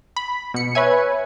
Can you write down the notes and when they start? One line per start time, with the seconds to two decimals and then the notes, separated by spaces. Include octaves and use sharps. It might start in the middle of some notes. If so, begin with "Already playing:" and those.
0.16 B5
0.54 B2 C#7
0.75 B4 C#5 E5 G#5